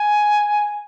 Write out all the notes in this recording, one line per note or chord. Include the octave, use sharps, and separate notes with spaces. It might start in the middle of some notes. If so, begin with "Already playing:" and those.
Already playing: G#5